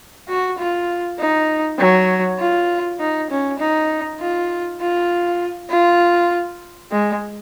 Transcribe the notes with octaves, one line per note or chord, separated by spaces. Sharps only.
F#4
F4
D#4
F#3
F4
D#4
C#4
D#4
F4
F4
F4
G#3